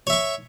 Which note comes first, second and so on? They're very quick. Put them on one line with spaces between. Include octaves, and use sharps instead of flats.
C#5 E5 C#6